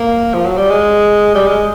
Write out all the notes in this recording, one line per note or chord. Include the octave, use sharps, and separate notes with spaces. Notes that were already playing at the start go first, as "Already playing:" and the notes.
Already playing: A#3
F3
F#3
G3
G#3
G3
G#3